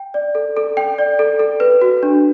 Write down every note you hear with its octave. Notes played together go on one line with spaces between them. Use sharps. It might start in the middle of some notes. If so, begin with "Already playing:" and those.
Already playing: G5
D5
A4
A4
G5
D5
A4
A4
B4
F#4
D4